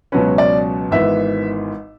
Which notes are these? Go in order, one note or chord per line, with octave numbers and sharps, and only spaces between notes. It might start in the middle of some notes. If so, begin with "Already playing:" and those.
C#2 B2 F#3 C#4 B4
D5
G#1 G#2 E3 B3 E5